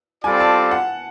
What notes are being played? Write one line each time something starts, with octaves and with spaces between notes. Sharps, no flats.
G3 C4 F4 A4 D5 G#5
A5
F#5